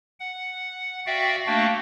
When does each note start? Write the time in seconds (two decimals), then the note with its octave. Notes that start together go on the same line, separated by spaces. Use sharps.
0.20 F#5
1.06 F#4 D5 E5 F5 G5
1.47 A3 A#3 D4 F#4 F5 G5